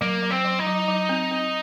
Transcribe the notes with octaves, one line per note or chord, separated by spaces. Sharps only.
F#3 A#3
F#3
C4
F#3
D#4
F#3
F#3
C4
C4